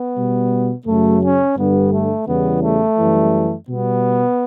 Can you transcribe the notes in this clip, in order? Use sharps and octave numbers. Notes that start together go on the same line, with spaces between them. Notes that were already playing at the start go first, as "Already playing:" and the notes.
Already playing: B3
B2 G3
F#2 C#3 F#3 A3
C#4
G2 D3 G3 B3
A3
E2 C#3 E3 G3 B3
A3
F#2 E3 G3
B2 G3 B3